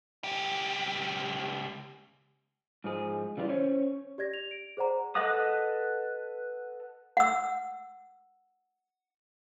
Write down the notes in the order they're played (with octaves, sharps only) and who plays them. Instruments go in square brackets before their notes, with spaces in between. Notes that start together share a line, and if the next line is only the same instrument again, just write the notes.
[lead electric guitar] C#2 G4
[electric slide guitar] G#2 F3 G#4
C#3 E3 G3 E4 F4
C#4 C5 C#5
[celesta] G4 D5 G#6 A#6
F7
D7
G#4 C5 D5 F#5 A#5
[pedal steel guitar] A4 B4 D#5 F#5 D#6
[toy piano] F#5 E6